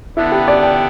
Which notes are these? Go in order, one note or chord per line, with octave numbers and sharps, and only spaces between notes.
D3 B3 D4 E4
G4
D5
G5